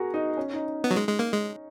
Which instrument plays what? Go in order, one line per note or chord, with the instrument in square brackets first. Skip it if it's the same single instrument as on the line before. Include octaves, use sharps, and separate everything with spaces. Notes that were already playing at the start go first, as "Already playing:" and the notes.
Already playing: [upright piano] F#4 G#4 A#4
D#4
C#4
D#4
[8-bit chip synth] B3
F#3
G#3
G#3
A#3
G#3